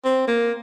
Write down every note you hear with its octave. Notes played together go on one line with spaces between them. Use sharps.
C4
A#3